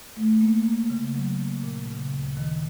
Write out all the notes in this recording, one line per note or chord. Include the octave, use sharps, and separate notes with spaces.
A3
A#3
A#3
C#3
F#3
A#3
A#2
C#3
D2
D#3